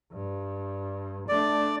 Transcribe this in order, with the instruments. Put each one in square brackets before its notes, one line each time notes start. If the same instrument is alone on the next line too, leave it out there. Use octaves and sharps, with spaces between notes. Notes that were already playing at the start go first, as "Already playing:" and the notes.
[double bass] G2
[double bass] A3 D4 [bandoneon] D5